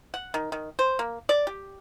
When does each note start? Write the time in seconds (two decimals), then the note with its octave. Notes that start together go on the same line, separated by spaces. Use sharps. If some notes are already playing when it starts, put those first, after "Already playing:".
0.14 F#5
0.34 D#3
0.52 D#3
0.79 C5
0.99 A#3
1.29 D5
1.47 G4